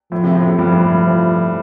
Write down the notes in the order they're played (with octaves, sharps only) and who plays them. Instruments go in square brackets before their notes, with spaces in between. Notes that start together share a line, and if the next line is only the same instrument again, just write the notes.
[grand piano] A2 [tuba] F3
[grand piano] C3
A2
C3
[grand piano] G2 [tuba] F3
[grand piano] G2
A2
[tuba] F3